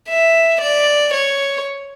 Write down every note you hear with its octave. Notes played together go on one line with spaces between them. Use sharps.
E5
D5
C#5